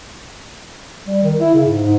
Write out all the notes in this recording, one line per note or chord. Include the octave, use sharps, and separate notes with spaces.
G3
D#3
E4
C#3
G#2
G#2